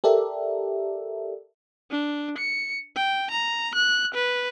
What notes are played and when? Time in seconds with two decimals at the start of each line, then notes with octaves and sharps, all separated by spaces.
0.04 G4 A4 A#4 D5 E5
1.90 D4
2.38 C#7
2.96 G5
3.31 A#5
3.75 F#6
4.14 B4